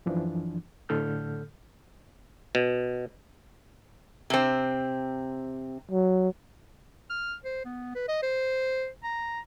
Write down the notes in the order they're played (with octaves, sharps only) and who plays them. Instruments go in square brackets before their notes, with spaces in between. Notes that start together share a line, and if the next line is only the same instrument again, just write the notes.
[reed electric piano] F#2 E3 F3 D4
A2 D3 A4 F6 G6
[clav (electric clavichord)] B2
[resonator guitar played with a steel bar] C3 C4
[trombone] F#3
[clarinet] F6
C5
B3
B4
D#5
C5
A#5